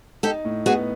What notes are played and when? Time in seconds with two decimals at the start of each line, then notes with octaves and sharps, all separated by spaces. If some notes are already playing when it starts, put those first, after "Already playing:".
0.23 D#4 G4 A4
0.45 A2
0.66 B3 F#4 G#4